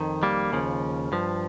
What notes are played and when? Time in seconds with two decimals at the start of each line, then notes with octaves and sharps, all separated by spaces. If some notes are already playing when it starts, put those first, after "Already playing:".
Already playing: F2 D#3
0.23 G3 A#3
0.52 D#2 C#3 F3
1.12 G2 F3